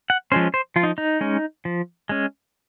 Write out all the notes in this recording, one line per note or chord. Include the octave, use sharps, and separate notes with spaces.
F#5
F3 G#3 C#4 C5
C5
F3 F4
D#4
D#4
G#3 C#4
F3
G#3 C#4